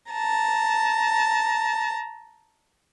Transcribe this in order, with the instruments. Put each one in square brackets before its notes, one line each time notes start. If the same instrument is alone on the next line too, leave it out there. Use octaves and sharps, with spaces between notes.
[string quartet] A5 A#5